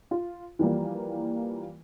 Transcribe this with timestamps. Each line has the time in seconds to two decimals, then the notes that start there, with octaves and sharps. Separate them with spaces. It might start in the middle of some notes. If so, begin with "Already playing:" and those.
0.11 F4
0.59 E3 F3 G3 A#3